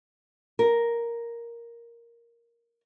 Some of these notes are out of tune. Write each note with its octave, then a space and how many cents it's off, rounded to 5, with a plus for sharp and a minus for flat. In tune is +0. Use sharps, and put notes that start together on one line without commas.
A#4 +5